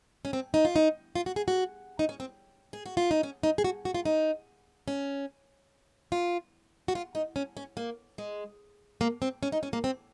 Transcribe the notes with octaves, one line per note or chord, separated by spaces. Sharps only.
C#4
C4
D#4
F4
D#4
F4
F#4
G#4
F#4
D#4
C#4
C4
G#4
F#4
F4
D#4
C#4
D#4
G#4
F#4
F#4
F4
D#4
C#4
F4
F#4
F4
D#4
C#4
C#4
A#3
G#3
A#3
C4
C#4
D#4
C#4
A#3
C4